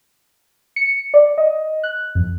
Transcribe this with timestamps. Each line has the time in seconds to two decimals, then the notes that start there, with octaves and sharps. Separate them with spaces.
0.76 C#7
1.14 D5
1.38 D#5
1.83 F#6
2.15 F2